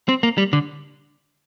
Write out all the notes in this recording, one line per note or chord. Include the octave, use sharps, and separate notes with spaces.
C4
A#3
G3
D3